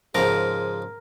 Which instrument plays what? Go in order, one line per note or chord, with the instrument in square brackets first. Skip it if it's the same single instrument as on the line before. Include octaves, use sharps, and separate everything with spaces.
[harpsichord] G#2 C#3 F3 [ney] G#4 [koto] A#4